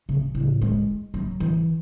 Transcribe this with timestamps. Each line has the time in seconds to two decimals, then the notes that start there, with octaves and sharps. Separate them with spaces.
0.09 C#3
0.35 A2
0.61 G#3
1.14 F#3
1.40 E3